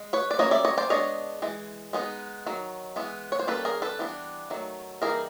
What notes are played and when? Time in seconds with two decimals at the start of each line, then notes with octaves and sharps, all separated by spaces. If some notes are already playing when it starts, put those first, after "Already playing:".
Already playing: G#3
0.13 B4 C#5
0.31 D5
0.39 G3 A#3 C#4 C#5 D#5
0.51 D5 E5
0.65 C#5 D#5
0.78 C5 D5
0.90 G#3 B3 D4 C#5 D#5
1.42 E3 G#3
1.93 G#3 B3 D#4
2.47 D#3 F#3
2.96 E3 G#3 B3
3.32 C#5
3.39 C5
3.47 G3 A#3 C#4 A4 B4
3.65 G#4 A#4
3.82 A4 B4
3.99 E3 G3 B3 D4
4.50 D#3 F#3 A3
5.02 E3 G3 A#3 D#4 G#4 A#4